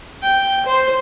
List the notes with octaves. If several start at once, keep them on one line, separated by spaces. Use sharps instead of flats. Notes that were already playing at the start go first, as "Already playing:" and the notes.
G5
C5